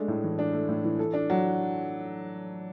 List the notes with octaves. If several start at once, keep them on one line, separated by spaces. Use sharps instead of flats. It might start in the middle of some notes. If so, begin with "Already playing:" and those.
Already playing: G#3 A3 D4
A2
E3
D4
A3
A2
E3
A4
D4
F#3